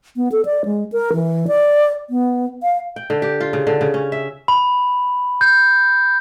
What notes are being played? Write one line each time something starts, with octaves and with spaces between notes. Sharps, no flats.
B3
A4
D5
G#3
A#4
E3
D5
B3
F5
G5
D3
G4
F4
C#3
D3
C#3
C#4
E5
B5
G6